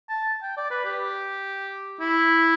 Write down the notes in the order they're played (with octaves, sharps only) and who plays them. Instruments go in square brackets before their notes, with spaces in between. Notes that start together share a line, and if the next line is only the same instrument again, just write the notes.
[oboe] A5
G5
D5
B4
G4
E4